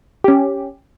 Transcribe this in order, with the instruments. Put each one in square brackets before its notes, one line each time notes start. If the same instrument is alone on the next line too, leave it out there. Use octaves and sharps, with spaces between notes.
[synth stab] C#4 G4